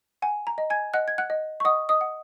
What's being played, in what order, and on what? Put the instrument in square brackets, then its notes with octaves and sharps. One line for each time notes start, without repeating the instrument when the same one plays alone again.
[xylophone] F#5 G#5
A#5
D#5
G#5 G#6
D#5 F#5 F#6
G#6
F#5 F#6
D#5
C#6
D#5 F#5 D#6
D#5 D#6
F#5